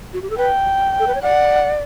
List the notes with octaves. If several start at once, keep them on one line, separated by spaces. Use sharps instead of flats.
F#4
G4
A4
B4 G5
A4
B4
C#5
D5 F#5